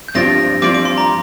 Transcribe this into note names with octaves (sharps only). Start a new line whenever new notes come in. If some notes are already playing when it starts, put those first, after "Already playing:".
G6
G2 F3 C4 F4 D5 A#6
G2 F3 C4 F4 D5 D6
D6
C6
A#5